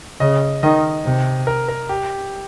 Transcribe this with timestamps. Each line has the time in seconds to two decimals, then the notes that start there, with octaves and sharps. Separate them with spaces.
0.20 C#3 D#5
0.63 D#3 D#5
1.05 C3
1.47 A#4
1.68 A#4
1.89 G4